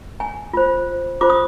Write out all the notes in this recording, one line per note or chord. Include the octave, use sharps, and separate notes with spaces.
G#5
F4 C5
F4 C5 D6
D#6